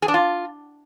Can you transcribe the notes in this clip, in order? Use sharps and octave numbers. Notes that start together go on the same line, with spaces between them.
G#4
D4
F4